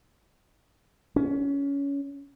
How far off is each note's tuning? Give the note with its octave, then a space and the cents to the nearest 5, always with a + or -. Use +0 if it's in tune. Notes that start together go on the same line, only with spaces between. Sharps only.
C#4 +20